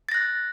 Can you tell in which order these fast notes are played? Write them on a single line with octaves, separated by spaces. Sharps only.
A6 A#6 F#6